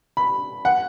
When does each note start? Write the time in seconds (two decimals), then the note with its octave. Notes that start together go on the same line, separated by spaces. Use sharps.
0.17 B5
0.65 F#5